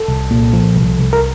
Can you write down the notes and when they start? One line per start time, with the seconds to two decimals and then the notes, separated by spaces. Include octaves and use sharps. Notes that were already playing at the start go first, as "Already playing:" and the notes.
Already playing: A4
0.08 C2
0.31 A#2
0.53 F3
0.76 C2
0.99 C2
1.13 A#4